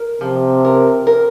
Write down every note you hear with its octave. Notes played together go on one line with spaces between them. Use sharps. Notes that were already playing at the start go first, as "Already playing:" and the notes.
Already playing: A#4
C3 F3
A#4
A#4